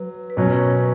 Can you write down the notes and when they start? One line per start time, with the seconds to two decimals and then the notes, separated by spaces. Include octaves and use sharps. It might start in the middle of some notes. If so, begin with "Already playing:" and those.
Already playing: F#3 B4
0.30 B4
0.37 B2 F#3 C#4 C#5
0.54 A#4
0.60 B4